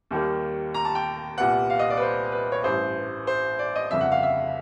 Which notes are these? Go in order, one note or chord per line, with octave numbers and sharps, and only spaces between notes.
D#2 D#3 G3 A#3
A#5
A5
G5
C2 A#2 G3 B3 F#5
F5
D#5
D5
B4
C5
B4
C#5
A1 G2 E3 C5
C5
D5
D#5
G1 F2 C#3 E5
F#5
F5
E5